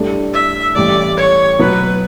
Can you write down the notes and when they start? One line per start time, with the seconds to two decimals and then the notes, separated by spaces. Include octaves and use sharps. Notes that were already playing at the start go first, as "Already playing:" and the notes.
Already playing: A2 G3 D4 A4
0.33 E5
0.75 A1 A2 G3 D5
1.17 C#5
1.59 B2 F#3 B3 B4